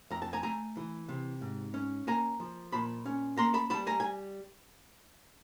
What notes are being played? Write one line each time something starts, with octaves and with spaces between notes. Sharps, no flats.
F2 A#5
A5
G#5 A#5
A3 G#5 A#5
E3
C3
G#2
C#4
A#3 G#5 A#5
F3
A#2 A5 B5
C#4
A#3 A#5 C6
A5 B5
G3 A5 B5
G#5 A#5
G#5